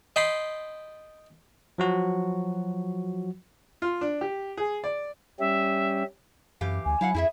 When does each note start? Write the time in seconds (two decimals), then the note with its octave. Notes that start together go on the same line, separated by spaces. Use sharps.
0.16 D#5 G5 A5 B5 C6
1.78 F3 F#3 F#4
3.82 F4
4.01 D4
4.21 G4
4.57 G#4
4.84 D5
5.39 G3 C#4 G4 E5
6.61 F#2 E3 G4 F5
6.86 D2 G#5
7.01 F#3 E4 F5 F#5
7.14 F2 E4 G#4 E5